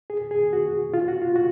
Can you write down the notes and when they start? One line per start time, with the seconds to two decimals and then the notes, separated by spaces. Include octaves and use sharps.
0.10 G#4
0.31 G#4
0.53 F#4
0.94 F4
1.08 F#4
1.22 F4
1.36 F#4